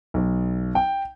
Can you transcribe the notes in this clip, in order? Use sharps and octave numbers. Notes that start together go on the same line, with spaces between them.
B1
G5